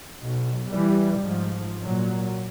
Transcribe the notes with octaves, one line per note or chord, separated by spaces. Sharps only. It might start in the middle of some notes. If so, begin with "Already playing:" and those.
B1
E3 G3
G#2 F3
A#2 F#3